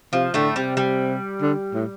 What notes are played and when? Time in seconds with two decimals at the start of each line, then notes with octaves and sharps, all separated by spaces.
0.13 C3 F3
0.34 A2 D3 A3
0.56 C3 G3
0.77 G3
1.42 D3
1.74 A2